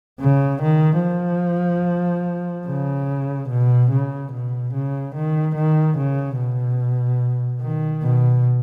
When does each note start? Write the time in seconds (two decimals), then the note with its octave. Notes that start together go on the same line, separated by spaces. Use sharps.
0.20 C#3
0.62 D#3
1.02 F3
2.67 C#3
3.49 B2
3.91 C#3
4.32 B2
4.74 C#3
5.15 D#3
5.56 D#3
5.97 C#3
6.38 B2
7.62 D#3
8.03 B2